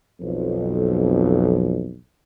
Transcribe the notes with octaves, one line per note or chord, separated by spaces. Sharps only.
B1 F2